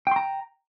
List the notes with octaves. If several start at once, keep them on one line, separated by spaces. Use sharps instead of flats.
G5 A#5 C6